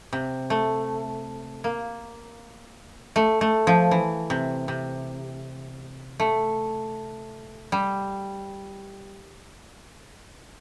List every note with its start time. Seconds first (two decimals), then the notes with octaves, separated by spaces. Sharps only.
0.13 C3
0.50 A3
1.64 A#3
3.16 A3
3.41 A3
3.67 F3
3.91 E3
4.30 C3
4.68 C3
6.20 A3
7.72 G3